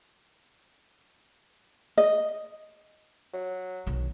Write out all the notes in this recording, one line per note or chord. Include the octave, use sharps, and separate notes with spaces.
D#5
F#3
B1 D#3